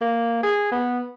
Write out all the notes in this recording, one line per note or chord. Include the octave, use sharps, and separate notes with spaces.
A#3
G#4
B3